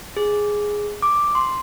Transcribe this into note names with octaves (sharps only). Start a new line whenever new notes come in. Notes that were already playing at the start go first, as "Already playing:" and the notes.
G#4
D6
C6